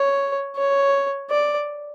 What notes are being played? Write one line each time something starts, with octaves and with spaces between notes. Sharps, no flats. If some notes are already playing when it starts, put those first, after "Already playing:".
Already playing: C#5
C#5
D5